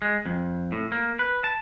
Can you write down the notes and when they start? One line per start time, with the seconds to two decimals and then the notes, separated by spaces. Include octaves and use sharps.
0.02 G#3
0.25 F2
0.72 A2
0.92 A#3
1.19 B4
1.44 A5